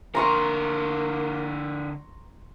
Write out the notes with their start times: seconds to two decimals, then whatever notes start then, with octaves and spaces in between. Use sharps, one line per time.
0.15 D3 A#3 A#4 A#5 C6 C#6